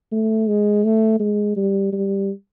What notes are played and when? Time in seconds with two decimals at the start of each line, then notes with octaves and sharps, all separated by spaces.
0.12 A3
0.48 G#3
0.84 A3
1.20 G#3
1.56 G3
1.93 G3